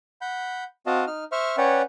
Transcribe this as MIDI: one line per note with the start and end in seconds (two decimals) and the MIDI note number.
0.21 0.64 78
0.21 0.64 83
0.21 0.64 91
0.86 1.05 60
0.86 1.05 66
0.86 1.05 75
0.86 1.05 77
0.86 1.05 81
1.07 1.24 63
1.07 1.24 89
1.32 1.56 72
1.32 1.56 76
1.32 1.56 85
1.32 1.56 89
1.58 1.82 61
1.58 1.82 71
1.58 1.82 73
1.58 1.82 74
1.58 1.82 78
1.58 1.82 79